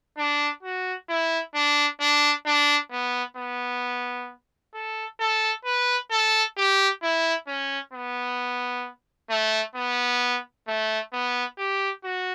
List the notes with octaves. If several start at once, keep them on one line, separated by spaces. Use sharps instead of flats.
D4
F#4
E4
D4
D4
D4
B3
B3
A4
A4
B4
A4
G4
E4
C#4
B3
A3
B3
A3
B3
G4
F#4